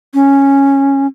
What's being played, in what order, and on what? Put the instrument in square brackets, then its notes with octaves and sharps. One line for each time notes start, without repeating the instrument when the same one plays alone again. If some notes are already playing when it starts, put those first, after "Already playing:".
[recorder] C#4